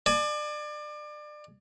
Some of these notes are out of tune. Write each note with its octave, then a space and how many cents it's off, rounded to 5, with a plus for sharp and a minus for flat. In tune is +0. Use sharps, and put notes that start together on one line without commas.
D5 +30 G#5 +40